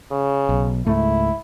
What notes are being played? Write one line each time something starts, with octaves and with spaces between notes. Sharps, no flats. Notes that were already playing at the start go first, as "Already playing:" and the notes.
C#3
B1
C#2 G#2 A3 E4